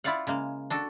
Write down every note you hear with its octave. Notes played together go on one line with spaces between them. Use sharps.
E4 F4 D5 F5 F#5
C#3 G#3 A#3
D4 F#4 A4